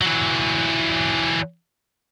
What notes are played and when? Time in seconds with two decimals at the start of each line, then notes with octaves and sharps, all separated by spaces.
0.02 E3 F#3